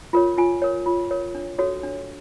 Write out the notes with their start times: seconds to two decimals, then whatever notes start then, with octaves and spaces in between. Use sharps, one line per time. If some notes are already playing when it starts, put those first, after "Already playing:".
0.13 F4 A#4 C#5
0.38 F4 G#5
0.62 A#4 C#5
0.86 F4
1.11 A#4 C#5
1.35 D4
1.58 F#4 A4 C#5
1.83 D4